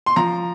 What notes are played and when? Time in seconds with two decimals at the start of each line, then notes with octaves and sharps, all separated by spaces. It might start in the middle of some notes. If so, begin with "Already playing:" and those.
0.06 C6
0.16 F3 A#5